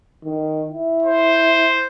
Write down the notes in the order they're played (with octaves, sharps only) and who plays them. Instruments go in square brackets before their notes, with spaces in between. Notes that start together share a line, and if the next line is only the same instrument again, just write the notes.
[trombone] D#3
E4
[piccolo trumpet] C5